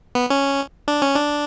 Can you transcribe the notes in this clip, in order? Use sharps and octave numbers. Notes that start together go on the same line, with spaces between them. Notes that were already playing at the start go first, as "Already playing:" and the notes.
B3
C#4
D4
C#4
D4